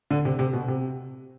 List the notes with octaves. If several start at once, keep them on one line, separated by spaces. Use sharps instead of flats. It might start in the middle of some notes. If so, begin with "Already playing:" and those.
D3
C3
C3
B2
C3